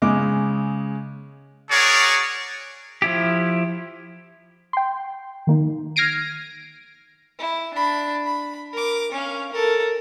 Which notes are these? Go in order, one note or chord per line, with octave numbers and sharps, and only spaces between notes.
C#3 G#3 D6
F#4 G#4 A#4 C#5 D5 F#5
F3 E4 G4
G5 C6
D#3 A#3 D#4
F6 G#6 A#6 C7 D7 D#7
E4
D4 B5
B5
A#4 D6
C#4 F5
A4 A#4